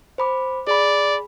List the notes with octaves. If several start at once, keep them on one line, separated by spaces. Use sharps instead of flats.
C5 B5 D6
G#4 D5 B5